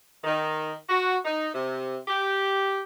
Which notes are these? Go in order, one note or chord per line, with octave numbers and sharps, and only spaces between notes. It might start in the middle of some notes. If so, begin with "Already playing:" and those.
D#3
F#4
D#4
C3
G4